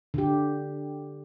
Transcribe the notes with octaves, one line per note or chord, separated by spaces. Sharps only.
D3 G4